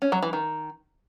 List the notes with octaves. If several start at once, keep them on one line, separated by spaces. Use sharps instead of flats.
C#4
F#3
E3
D#3